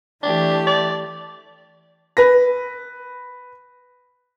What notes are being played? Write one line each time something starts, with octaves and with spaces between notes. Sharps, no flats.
E3 A3 D4 G4
D5
B4 A#6